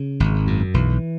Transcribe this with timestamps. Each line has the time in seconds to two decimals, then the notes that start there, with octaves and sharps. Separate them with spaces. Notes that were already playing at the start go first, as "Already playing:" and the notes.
Already playing: C#3
0.20 G#1
0.47 F#2
0.74 B1 E3